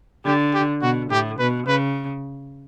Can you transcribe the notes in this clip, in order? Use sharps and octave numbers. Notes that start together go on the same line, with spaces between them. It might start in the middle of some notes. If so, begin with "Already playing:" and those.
D3 G4
G4
B2 F#4
A2 G4
B2 B4
C#3 B4